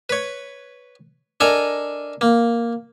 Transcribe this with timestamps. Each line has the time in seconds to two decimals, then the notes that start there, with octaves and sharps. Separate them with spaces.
0.09 B4 C#5
1.40 D4 A4 A#4 D#5 G#5 A#5
2.21 A#3